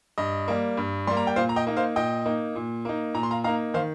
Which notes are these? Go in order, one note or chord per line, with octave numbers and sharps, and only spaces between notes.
G2 D#5
G3 A#3
G2
G3 A#3 C6
A#5
G5
A#2 C5 F5
A#5
D#5 G5
A#3 D#4
C5 F5
A#2 D#5 G5
A#3 D#4
A#2
A#3 D#4
A#2 A#5
C6
F5 A#5
A#3 D#4 F5 A#5
D#3 C5 F5